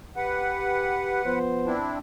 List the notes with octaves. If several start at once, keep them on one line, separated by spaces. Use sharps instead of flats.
G4 B4 F#5
F3 B3 C5
C4 D4 E4